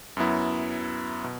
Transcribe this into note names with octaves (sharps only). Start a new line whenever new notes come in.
F#2 F#3 B3 E4
B2